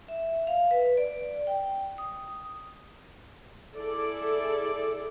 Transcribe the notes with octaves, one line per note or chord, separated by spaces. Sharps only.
E5
F5
B4
D5
G5
D#6
E4 G#4 A4 D5